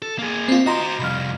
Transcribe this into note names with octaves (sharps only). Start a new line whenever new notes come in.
A4
A#3 G#4
C4 F4
F#4 C5 D#5 A#5 C6
C2 F2 B5 F6